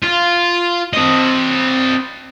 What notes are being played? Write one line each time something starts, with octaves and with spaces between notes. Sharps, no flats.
F4
C4 D#5